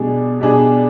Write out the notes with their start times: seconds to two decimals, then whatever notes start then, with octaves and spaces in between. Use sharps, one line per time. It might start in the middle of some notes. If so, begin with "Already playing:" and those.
Already playing: B2 G3 D4 G#4
0.40 B2 G3 D4 G#4